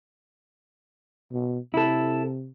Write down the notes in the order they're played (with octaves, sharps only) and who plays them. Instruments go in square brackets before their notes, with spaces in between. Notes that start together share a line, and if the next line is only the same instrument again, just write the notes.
[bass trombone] B2
[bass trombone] C3 [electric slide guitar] E4 A4